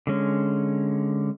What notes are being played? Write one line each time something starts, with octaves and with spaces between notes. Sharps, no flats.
D3 G#3 C#4